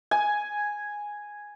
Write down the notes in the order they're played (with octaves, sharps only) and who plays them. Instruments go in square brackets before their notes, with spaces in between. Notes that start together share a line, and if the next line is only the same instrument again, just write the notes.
[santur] G#5